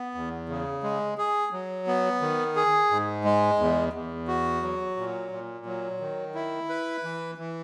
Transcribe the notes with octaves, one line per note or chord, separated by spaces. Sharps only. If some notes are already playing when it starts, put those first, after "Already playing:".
Already playing: B3
E2
C#3
G#3
G#4
F#3
B3
D#3
G#4
G#2
G#3
E2
E2
F#4
F#3
A#2
A#2
F#3
D#3
E4
B4
E3
E3